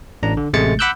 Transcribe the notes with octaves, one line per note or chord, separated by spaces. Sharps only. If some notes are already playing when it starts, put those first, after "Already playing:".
A1 D4 A#5
D3
A1 C3 G#3 A3 A6 C#7
F#5 B5 D6 E6 F#6 G6